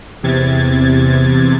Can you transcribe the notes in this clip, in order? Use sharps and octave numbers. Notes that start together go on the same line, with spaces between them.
E2 C3 G#6 A6